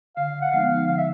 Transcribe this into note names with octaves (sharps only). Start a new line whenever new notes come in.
D3 F5
F#5
F3 G#3 B3 D#4 F5
D3 F5
E5